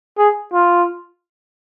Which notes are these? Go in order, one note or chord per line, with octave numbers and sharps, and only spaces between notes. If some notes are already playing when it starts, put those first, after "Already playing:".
G#4
F4